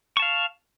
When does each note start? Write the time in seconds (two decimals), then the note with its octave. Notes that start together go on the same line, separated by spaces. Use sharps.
0.17 C#6
0.20 A5
0.22 F5